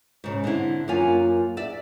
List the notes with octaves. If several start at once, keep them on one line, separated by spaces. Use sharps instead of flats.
G#2 C#3
D3 C4 E4
F#2 A#3 F4 G#5
D5 E5